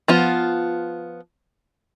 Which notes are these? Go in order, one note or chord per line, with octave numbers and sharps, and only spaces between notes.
F3 B3 F4